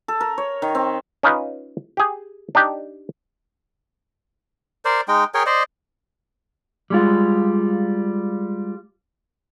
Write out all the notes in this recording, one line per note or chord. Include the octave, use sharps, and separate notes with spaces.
A4
A#4
C#5
D#3
C4
C#4 D#4 F4 B4
G4 G#4
D4 D#4 G4
A#4 C5 D5
G#3 D#4 G5
G#4 A#4 C#5 G5
C5 D5 D#5
G3 G#3 F4